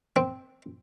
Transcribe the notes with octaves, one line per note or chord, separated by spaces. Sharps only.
C4